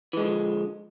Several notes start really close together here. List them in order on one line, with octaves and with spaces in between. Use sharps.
E3 G#3 D3 F3